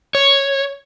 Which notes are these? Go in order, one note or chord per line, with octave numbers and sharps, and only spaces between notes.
C#5